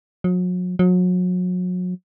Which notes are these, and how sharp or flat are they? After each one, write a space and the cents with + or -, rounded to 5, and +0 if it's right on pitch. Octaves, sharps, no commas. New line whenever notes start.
F#3 -40
F#3 -35